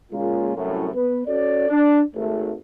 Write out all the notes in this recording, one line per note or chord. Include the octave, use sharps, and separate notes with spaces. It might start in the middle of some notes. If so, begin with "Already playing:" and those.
A#2 C#3 G#3 A#3 C#4 F4
C2 F#2 A2
B3 B4
C#4 F#4 A4 C#5 D5
D4
G#1 A3